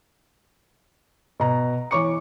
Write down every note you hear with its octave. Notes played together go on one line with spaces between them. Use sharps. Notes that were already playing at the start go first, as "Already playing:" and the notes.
B2 A#5
E3 C#5 C#6 D6 C#7